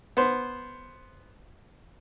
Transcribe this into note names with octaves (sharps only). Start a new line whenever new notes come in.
B3 C5